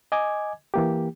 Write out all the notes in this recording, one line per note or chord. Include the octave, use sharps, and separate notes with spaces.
D#5 G#5 D6 G#6
E3 A#3 G4